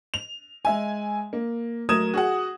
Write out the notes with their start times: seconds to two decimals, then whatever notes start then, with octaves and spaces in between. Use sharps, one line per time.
0.14 F7
0.65 G#3 E5 G#5
1.33 A#3
1.89 F#3 A3 A#4 D#6 G#6 E7
2.14 F#4 G#4 F#5